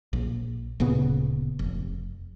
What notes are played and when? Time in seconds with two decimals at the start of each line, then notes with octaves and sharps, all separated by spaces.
0.13 A#1
0.80 D1 A#2 C#3 B3
1.59 F1